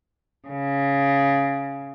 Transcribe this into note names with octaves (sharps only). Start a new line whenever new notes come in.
C#3